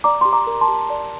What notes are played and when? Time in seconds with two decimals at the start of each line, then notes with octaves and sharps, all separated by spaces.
0.04 D5 A#5 D6
0.21 G4 C6
0.33 A#5 D6
0.47 A#4
0.61 A5 C6
0.69 G4
0.90 D5